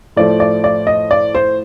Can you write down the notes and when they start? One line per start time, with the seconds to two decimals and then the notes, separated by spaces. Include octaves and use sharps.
0.16 A2 F3 A3 D5
0.40 D5
0.64 D5
0.87 D#5
1.11 D5
1.35 C5